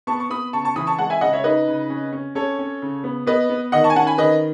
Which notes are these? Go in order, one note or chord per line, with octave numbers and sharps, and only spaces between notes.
B3 A5 C#6
C#6
B3 B5 D#6
C#3 A5 C#6
A5 C#6
E3 B5 D#6
A5 C#6
G#3 F#5 A5
E5 G#5
C#3 D#5 F#5
C#5 E5
D#4 B4 D#5
C#3
C#4
C#4
C#4 A4 C#5
C#4
C#3
B3
B3 B4 D#5
B3
D#3 D#5 F#5
A5 C#6
G#5
C#4 F#5 A5
G#5 B5
D#3 B4 D#5